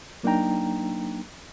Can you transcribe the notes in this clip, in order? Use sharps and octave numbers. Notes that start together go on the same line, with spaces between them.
F#3 A#3 D4 D#4 G5 A#5